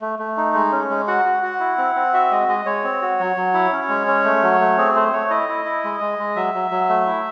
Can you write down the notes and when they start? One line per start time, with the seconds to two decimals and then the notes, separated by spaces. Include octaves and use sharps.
0.01 A3
0.19 A3
0.37 D#4
0.55 G#3
0.72 C#4
0.90 G#3
1.08 F#4 F#5
1.25 F#4
1.43 F#4
1.60 E4
1.78 C4
1.95 C4
2.14 F#4 E5
2.31 G#3 D#5
2.48 G#3 D#5
2.66 G#3 C#5
2.84 C4
3.02 F#4
3.20 F#3
3.36 F#3
3.54 E4
3.72 C#4
3.89 G#3
4.07 C#4
4.25 A3
4.43 F#3
4.60 A3
4.78 C4 G#4
4.95 A3 C5
5.13 A3 C#5
5.30 E4 D#5
5.49 E4
5.65 E4
5.84 G#3
6.01 G#3
6.19 G#3
6.36 F#3 E5
6.54 F#3
6.71 F#3
6.89 A3
7.07 E4